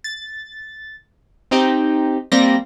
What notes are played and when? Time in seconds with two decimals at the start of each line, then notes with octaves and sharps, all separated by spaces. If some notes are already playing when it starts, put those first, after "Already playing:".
0.04 A6
1.51 C4 D#4 G4
2.32 G3 A#3 C4 A#6